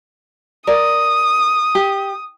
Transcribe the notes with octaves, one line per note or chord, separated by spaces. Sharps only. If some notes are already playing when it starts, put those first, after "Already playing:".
A#4 D5 D#6
G4